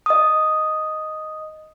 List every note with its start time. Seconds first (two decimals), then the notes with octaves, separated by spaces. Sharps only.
0.06 D#5 D#6